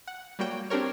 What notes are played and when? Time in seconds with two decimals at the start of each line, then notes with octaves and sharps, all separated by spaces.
0.08 F#5
0.39 G3 A#3 F#4 C#5 G5
0.70 C4 D4 G4 A#4 C#5